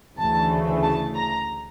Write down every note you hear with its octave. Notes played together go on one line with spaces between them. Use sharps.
D2 C#3 E3 A3 A5
A5
A#5